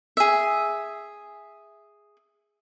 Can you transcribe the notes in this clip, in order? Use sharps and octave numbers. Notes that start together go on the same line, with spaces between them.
G#4 E5